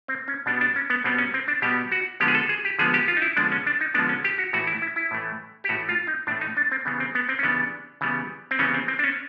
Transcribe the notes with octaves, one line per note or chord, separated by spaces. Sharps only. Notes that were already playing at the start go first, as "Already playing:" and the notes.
C4
C#4
B2 G3 B3 D4
D4
C#4
B3
B2 G3 B3 C4
C#4
C4
D4
B2 G3 B3 G4
F#4
D3 F3 G#3 B3 G4
G#4
A4
G#4
G4
D3 F3 G#3 B3 G#4
G4
F4
D#4
E4
D3 F3 G#3 B3 D4
C#4
D4
D#4
D3 F3 G#3 B3 D4
C#4
G4
F#4
A2 E3 A3 F#4
E4
E4
E4
A2 E3 A3
G4
A2 E3 A3 F#4
F4
D#4
A2 E3 A3 D4
D#4
D4
C4
C#3 E3 G3 B3
C4
B3
C4
C#4
C#3 E3 G3 B3 D4
C#3 E3 G3 B3
C4
C#3 E3 G3 B3 C#4
C4
C4
D4
C#4